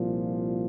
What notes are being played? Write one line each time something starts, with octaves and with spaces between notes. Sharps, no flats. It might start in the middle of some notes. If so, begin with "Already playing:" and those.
Already playing: C2 A#2 F3